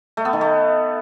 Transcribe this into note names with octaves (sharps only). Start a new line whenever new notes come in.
A3
B3
D#3
A3